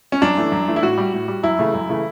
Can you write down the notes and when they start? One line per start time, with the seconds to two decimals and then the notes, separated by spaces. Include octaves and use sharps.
0.12 C#4
0.22 F#2 D4
0.37 E3 A3
0.52 F#2
0.68 E3 A3
0.76 E4
0.83 A2 F#4
0.98 G3
1.13 A2
1.28 G3
1.43 F#2 E4
1.59 C#3 E3 A3
1.74 F#2
1.89 C#3 E3 A3